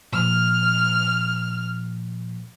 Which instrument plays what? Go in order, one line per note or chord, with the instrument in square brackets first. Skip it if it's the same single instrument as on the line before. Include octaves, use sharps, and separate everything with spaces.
[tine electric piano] A#2 F3 [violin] F6